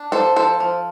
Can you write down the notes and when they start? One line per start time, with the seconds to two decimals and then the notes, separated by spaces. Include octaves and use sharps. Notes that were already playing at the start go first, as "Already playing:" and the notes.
Already playing: D4
0.12 F3 A4 C5
0.36 F3 A4 C5
0.60 F3